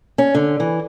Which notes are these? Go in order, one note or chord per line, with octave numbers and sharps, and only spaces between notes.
C#4
D3
E3